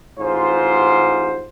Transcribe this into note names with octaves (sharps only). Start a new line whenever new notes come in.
A1 G#2 F4 C5